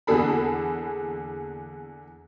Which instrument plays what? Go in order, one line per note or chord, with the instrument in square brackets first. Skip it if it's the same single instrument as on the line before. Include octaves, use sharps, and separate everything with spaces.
[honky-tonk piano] E2 D3 A#3 G#4 A4 B5